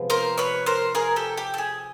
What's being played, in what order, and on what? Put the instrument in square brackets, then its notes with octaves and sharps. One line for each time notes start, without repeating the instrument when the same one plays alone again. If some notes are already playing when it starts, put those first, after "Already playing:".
Already playing: [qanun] C3 F3 G#3 B3
[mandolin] A#4 C5
B4 C#5
A#4 C5
G#4 A#4
G4 A4
G4
A4
G#4